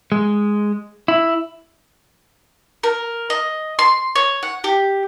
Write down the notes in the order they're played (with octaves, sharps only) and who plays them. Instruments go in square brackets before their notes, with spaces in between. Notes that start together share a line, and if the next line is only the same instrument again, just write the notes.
[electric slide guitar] G#3
E4
[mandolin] A#4
D#5
C6
C#5
F#5
G4